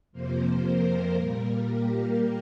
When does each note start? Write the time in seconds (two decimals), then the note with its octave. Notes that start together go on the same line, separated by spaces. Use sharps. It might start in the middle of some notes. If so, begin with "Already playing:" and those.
0.12 F2 C3 F3 A#3 C5
0.64 A#4
1.15 A#2 G3 A#3 A#4
1.66 G4